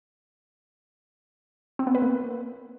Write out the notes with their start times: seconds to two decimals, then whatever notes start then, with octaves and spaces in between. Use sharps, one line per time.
1.79 C4
1.87 B3
1.95 B4
2.02 A#3